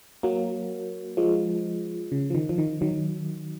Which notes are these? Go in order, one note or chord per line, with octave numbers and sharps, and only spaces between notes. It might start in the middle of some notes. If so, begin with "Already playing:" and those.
F#3 A#3
F3 G#3
C#3
F3
D#3
F3
D#3
D#3 F#3